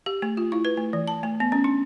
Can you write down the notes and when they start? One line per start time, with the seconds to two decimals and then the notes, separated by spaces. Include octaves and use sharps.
0.06 G4
0.22 A3
0.37 F4
0.52 E4
0.65 B4
0.77 A3
0.93 E3
1.08 A5
1.23 A3
1.40 B3
1.52 C#4
1.64 D4